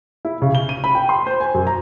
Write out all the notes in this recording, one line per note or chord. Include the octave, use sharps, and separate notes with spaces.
E4
C#3
G7
D#7
B5
G5
C6
C5
G#5
F#2
A#5